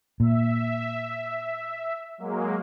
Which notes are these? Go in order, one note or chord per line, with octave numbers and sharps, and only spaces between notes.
A#2 E5
F#3 G#3 A#3